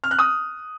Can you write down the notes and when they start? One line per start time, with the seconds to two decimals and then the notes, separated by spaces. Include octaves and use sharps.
0.04 F6
0.11 F#6
0.19 D#6